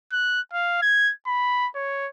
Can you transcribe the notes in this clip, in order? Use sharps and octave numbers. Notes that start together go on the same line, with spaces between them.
F#6
F5
G#6
B5
C#5